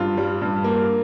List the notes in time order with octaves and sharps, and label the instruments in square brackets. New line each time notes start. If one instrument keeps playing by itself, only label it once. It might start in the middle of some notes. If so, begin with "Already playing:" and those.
Already playing: [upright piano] G2 F4
G3
G2
A#3